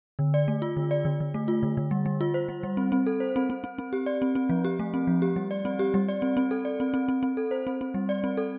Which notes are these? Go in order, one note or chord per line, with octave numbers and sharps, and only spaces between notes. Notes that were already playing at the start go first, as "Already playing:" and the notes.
D3
D5
A3
F4
D3
D5
D3
D3
A3
F4
D3
D3
G3
G3
F4
C5
G3
G3
C4
C4
A4
C5
C4
C4
C4
C4
G4
D5
C4
C4
F3
G4
A3
C4
F3
G4
G3
D5
C4
G4
G3
D5
C4
C4
A4
D5
C4
C4
C4
C4
A4
C5
C4
C4
G3
D5
C4
A4